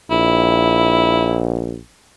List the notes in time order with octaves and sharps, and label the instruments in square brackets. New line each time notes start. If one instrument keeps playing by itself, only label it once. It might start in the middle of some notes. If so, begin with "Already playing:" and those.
[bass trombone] A#1 [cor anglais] E4